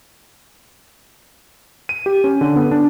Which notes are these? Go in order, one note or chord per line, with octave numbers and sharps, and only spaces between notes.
D#7
G4
C#4
D3
B3
D4